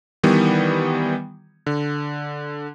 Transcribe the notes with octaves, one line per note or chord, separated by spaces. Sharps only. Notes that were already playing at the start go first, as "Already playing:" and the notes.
D#3 E3 G3 B3
D3